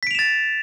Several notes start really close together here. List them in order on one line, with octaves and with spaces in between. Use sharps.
B6 D7 F7 E7 A6